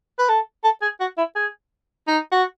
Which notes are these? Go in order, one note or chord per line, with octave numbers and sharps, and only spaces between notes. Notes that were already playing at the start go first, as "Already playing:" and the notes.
B4
A4
A4
G#4
F#4
E4
G#4
D#4
F#4